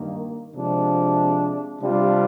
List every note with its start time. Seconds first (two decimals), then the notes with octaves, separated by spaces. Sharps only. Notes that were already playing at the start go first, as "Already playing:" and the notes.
Already playing: G2 D#3 A#3
0.55 C3 F3 G#3 D4
1.80 C3 G3 D4 F4